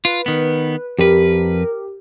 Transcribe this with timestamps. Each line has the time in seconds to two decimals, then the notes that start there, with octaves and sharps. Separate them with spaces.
0.05 F4 B4
0.26 D#3 B3
0.99 F2 G4 A#4 B4